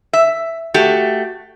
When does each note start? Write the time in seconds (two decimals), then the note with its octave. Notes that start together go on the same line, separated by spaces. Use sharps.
0.13 E5
0.74 A3 F#4 G4